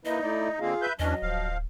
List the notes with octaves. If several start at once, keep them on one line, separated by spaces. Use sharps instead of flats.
A#3 D#4 E4 B4 D#5
A3 E4 D5
D3 A#3 C4 F4 G#4 F5
B4 E5 G6
E2 E3 F#3 C#4 D4 D#5
D1 F3 F5